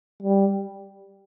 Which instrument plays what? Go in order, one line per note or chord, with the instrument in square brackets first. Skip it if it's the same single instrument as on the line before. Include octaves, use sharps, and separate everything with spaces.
[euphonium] G3